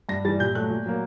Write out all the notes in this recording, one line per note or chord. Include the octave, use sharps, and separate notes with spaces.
G2 A#6
E3 G3 A6
A#2 G6
F#3 A3 F#6
A#2
F#3 A#3